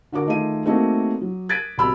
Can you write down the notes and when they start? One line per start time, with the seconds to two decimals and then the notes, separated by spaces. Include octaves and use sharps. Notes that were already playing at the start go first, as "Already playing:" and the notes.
0.12 D3 F#4 A#4 D6
0.26 D#3 A3 D#4 F4 G#4 D#7
0.65 A3 A#3 C4 D#4 F#4 G#4
1.21 F#3
1.49 F#6 G#6 A6 B6 D7 D#7
1.78 C2 B2 B5 E6 F6